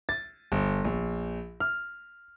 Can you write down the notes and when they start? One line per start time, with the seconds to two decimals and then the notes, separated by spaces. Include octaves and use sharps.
0.09 A6
0.52 G1
0.85 A#1
1.60 F6